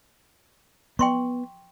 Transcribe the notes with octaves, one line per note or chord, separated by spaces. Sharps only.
B3 G5 C6 C#6